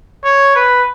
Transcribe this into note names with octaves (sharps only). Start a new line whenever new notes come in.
C#5
B4